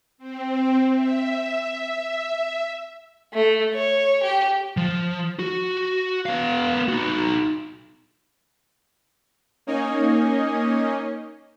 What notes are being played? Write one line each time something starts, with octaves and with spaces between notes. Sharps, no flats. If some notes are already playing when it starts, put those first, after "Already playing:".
C4
E5
A3
C#5
G4
F3
F#4
B3 F5
D#4 F#4
A#3 C#4 D#4 C#5 D#5 G#5